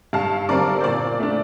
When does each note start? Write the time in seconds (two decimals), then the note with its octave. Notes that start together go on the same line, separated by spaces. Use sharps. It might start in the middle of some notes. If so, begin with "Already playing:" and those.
0.13 G2 F5 A5
0.49 D3 G3 C4 A#4 D5
0.81 C5
0.84 A#2 A#4 D5
1.19 A3 D4